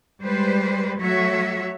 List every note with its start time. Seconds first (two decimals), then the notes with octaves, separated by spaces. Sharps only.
0.23 G3 G#3 B4 C5
0.98 F#3 A3 F#4 C#5 E5